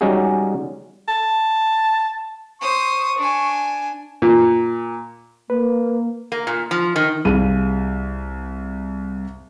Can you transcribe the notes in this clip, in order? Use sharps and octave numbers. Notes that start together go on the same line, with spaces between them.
G3 G#3 C#4 D#4 F#4 G#4
A5
C5 C#6 D#6
D4 G#5
A#2
A#3 B4
A#3
A#2
F3
D#3
C2 G#4 F5 D#7